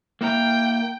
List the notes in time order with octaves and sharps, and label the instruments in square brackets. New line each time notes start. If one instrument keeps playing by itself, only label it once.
[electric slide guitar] A#3 E4 A#4 [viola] G5